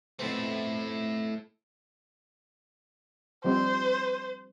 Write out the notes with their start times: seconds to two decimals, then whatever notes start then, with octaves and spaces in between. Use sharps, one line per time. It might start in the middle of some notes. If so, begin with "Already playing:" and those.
0.19 F2 B2 A3 C4 E4
3.44 F3 G3 C4 C5